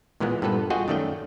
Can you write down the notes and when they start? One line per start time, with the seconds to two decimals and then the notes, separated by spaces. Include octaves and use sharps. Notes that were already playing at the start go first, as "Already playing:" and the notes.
0.20 A#2 E3 G#3 A#3 B3
0.42 G2 A#2 B3 A4 B4
0.70 F4 F#4 G#4 D#5 F#5 G5
0.88 F#2 D#3 A3 C#4 D5 G5